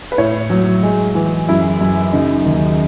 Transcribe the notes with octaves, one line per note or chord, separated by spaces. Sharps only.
B4
A2 C#5
F#3
G#3
E3
F#2 E4
F#2
C#3 D#4
D#2